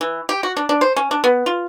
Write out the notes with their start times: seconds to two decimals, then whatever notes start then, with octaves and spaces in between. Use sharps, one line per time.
0.01 E3
0.29 G4
0.43 F#4
0.57 D4
0.69 D4
0.81 C5
0.96 C#4
1.11 D4
1.24 B3
1.46 F4